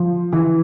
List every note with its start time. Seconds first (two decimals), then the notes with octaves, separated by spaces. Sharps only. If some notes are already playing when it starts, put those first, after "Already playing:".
Already playing: F3
0.33 E3